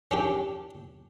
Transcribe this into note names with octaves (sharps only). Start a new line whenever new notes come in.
C#4 D4 G4